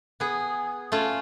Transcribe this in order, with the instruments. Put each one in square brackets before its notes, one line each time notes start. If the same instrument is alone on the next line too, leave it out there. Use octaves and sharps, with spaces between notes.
[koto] B3 G#4
A3 C#4 F4